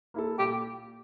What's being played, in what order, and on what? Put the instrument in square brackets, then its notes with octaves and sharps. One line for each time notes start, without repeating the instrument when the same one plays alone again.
[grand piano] A#3 E4 A4
[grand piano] A#2 [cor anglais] G4